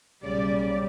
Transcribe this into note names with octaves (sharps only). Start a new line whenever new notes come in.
B1 A#2 C#3 G3 D5